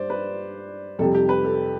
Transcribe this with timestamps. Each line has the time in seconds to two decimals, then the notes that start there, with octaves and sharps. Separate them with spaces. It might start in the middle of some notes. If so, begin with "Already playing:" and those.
Already playing: G2 C5 D5
0.10 B4
0.99 F2 C3 G3 A4
1.14 G4
1.29 B4
1.44 A4